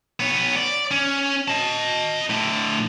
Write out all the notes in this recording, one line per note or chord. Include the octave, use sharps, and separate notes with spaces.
B3 C#5
D5
C#4
D#5 A5
A2 D3